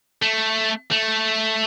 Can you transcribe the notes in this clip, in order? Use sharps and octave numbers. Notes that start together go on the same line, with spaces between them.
A3
A3